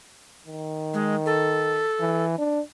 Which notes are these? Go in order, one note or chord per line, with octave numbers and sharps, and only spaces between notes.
D#3
G#3
A4
E3
D4